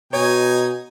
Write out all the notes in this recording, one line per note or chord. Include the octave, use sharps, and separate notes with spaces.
B2 D#4 C#5 G#5